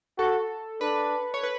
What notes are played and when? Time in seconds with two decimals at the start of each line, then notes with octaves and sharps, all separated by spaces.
0.18 F#4 A4
0.81 D4 B4
1.34 C#5
1.43 B4